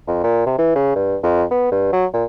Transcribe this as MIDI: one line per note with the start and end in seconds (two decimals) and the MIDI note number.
0.08 0.22 41
0.24 0.42 46
0.46 0.56 48
0.58 0.73 52
0.75 0.93 49
0.96 1.17 43
1.23 1.43 41
1.51 1.67 59
1.72 1.91 43
1.93 2.05 54
2.14 2.24 46